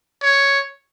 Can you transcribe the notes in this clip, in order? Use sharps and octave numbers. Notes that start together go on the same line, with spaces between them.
C#5